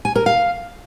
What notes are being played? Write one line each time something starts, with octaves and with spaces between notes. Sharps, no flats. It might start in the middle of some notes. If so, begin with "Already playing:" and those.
G#5
A#4
F5